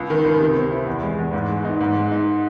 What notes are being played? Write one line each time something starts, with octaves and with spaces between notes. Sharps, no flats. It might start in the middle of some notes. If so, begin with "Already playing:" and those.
Already playing: C#2
D#3
C#2
C3
C4
E4
E2
G#3
E2
G#2
G#3
D#4
G#2
G#3
D#4